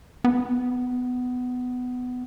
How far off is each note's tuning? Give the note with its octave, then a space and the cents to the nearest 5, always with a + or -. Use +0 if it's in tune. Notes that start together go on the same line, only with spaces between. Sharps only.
B3 +15